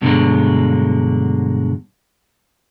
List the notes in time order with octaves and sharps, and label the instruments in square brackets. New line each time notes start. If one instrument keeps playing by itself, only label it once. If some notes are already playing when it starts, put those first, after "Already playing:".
[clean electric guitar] G2 B2 D3 D#3 F#3 G#3